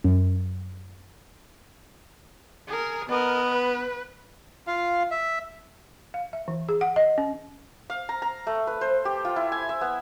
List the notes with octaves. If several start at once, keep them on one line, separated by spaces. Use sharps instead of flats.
F#2
G#4 A#4
B3 A#4 D#5
B4
F4 F5
E5
F5
E5
E3
G#4
F#5
D#5
C#4
F5
A#5
A#5
A3
B4
C5
G4
F4
E4
G#5
E5
B3